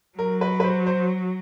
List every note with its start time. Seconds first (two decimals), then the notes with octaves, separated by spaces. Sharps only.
0.18 F#3 A#4
0.41 B4
0.60 B4
0.64 C5
0.86 C5